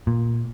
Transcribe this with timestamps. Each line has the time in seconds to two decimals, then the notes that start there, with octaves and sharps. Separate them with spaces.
0.07 A#2